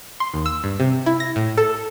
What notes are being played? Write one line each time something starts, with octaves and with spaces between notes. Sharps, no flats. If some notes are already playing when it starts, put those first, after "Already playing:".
C6
D#2
E6
G2
C3
E4
A#6
A2
A4